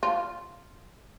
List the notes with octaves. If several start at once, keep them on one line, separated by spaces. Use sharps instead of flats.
F4